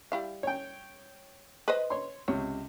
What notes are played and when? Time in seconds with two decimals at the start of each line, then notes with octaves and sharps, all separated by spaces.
0.12 G3 E4 F5
0.43 C#5 G5
1.68 B4 C5 D#5
1.90 C#5 C6
2.28 C#2 C3 C#5